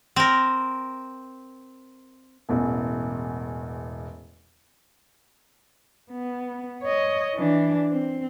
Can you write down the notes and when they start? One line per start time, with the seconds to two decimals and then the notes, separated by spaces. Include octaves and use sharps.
0.16 C4 A#4
2.49 E1 A1 E2
6.12 B3
6.82 C#5 D#5
7.35 E3 D4
7.92 C4